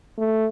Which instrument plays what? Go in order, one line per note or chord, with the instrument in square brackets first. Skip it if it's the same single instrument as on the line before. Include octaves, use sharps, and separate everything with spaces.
[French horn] A3